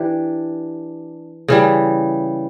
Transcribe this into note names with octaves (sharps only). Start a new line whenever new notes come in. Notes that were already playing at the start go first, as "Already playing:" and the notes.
Already playing: E3 D4 G4
C#3 E3 G3